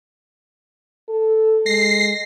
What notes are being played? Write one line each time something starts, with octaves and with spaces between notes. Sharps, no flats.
A4
G#3 A#6 C7